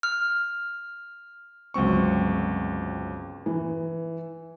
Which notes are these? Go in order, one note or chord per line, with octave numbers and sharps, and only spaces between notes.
F6
G1 C#2 F#3 C4 C#6
E3